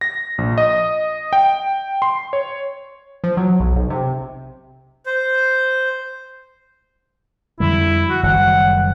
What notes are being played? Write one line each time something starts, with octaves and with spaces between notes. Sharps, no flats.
A#6
A#1
D#5
G5
C6
C#5
F3
F#3
B1
B1
C3
C5
F2 D3 G3 E4
F#4
F#1 D#3 G3 F#5